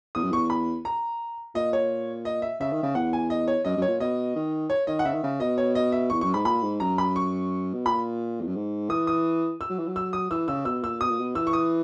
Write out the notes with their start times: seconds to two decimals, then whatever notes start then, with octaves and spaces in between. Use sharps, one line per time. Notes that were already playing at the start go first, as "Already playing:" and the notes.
0.15 E2 D#6
0.23 F#2
0.31 E2 C#6
0.50 B5
0.85 A#5
1.55 A#2 D#5
1.73 C#5
2.25 D#5
2.42 E5
2.60 C#3 E5
2.72 D#3
2.83 C#3
2.95 E2 F#5
3.13 G#5
3.30 D#5
3.48 C#5
3.65 F#2 D#5
3.77 F#2 C#5
3.88 A#2
4.00 B2 D#5
4.36 D#3
4.70 C#5
4.87 D#3 D#5
4.99 F#5
5.05 C#3 E5
5.14 D#3
5.23 C#3
5.40 B2 D#5
5.58 C#5
5.75 D#5
5.92 E5
6.10 E2 C#6
6.21 F#2 C#6
6.34 G#2 B5
6.45 A#2 B5
6.62 G#2
6.80 F#2 A#5
6.98 B5
7.16 C#6
7.73 B2
7.86 A#2 B5
8.40 E2
8.47 F#2
8.56 G#2
8.90 E3 D#6
9.07 D#6
9.61 E6
9.70 F#3
9.78 E3
9.88 F#3
9.96 E6
10.13 D#6
10.30 E3 E6
10.48 C#3 E6
10.65 B2 E6
10.83 A#2 E6
11.00 B2 D#6
11.09 A#2
11.19 B2
11.35 E3 E6
11.47 C#6
11.53 D#6